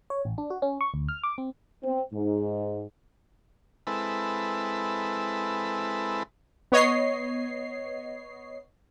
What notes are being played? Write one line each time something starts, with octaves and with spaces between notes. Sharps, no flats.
C#5
A1
D4
F#4
C#4
C#6
D2
F6
D6
C4
C4
G#2
G#3 C4 E4 A4 B4
B3 C#5 D#5 C7